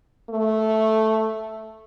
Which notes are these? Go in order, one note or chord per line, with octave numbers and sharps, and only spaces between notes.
A3